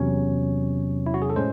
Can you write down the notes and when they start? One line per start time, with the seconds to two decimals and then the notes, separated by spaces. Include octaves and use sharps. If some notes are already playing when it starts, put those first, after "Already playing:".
Already playing: E2 C3 F#3 C#4 C#5
1.06 E4
1.14 F#4
1.22 G#4
1.30 A4
1.36 A2 G#3 C#4 C5